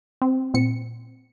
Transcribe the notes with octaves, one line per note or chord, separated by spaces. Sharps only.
C4
A#2 C4 C#7